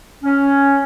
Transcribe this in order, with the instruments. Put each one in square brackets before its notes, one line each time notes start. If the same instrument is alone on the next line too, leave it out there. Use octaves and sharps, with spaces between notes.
[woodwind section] C#4